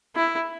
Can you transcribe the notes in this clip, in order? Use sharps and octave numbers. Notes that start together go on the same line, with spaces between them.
E4